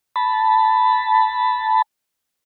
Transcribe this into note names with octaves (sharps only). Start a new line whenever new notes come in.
A5 B5